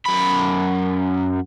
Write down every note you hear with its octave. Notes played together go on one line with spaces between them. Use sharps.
F#2 B5